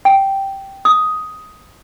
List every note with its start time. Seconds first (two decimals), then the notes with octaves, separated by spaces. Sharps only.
0.05 G5
0.85 D#6